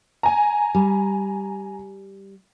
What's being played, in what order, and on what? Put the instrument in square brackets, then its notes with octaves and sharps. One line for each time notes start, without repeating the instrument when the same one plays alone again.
[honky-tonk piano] G#5 A#5
[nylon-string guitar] G3